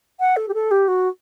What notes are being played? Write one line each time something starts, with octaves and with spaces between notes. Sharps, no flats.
F#5
A4
G4
A4
G4
F#4